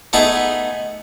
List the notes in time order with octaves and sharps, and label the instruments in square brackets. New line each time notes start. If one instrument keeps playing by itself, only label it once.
[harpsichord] A3 B3 D#4 G#4